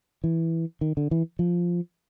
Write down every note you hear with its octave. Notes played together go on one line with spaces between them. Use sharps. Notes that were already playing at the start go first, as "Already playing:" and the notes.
E3
D#3
D3
E3
F3